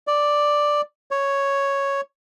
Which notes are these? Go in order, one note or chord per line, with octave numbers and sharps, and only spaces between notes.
D5
C#5